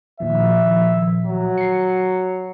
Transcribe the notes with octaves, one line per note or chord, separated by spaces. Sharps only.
A#2 D#3 F3 E5
F#3
C7 C#7